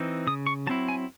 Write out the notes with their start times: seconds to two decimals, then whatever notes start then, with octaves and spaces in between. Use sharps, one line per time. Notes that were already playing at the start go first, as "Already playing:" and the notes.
Already playing: E3 C4 D#4
0.27 C#3 D#6
0.47 C#6
0.67 F#3 C4 E4 A5
0.88 G#5